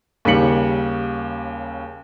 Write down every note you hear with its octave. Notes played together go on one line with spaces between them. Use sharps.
D#2 C#3 G3 B6 C#7 F#7